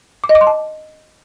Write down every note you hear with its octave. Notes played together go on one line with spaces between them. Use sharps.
D6
D#5
D6
C6
A5